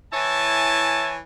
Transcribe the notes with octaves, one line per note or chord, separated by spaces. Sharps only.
E3 E4 C#5 G#5 A5